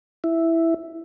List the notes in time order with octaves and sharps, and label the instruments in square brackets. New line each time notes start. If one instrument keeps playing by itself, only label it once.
[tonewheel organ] E4